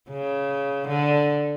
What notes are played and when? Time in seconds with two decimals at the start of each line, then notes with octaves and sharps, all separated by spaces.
0.10 C#3
0.88 D3